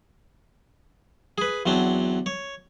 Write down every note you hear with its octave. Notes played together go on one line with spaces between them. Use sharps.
G#4 B4
E2 F#3 C4 D4
C#5